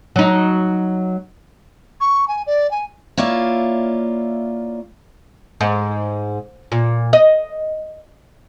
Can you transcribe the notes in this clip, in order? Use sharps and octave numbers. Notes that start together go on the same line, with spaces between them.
F#3 D#4
C#6
G#5
D5
G#5
A#3 E4 F4 C#5 D5 E5
G#2
A#2
D#5